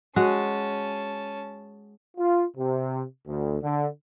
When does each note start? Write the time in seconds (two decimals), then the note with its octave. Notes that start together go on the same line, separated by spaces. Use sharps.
0.16 G#3 C#4 F#4 A5
2.17 F4
2.57 C3
3.27 D2
3.62 D3